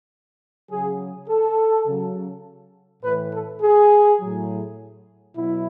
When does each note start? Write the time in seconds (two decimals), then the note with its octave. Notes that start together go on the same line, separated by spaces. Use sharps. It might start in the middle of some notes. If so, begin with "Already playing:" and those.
0.71 C#3 F#3 G#4
1.28 A4
1.87 C#3 F#3
3.03 A2 E3 B4
3.33 A4
3.62 G#4
4.20 A2 F#3
5.36 B2 F#3 E4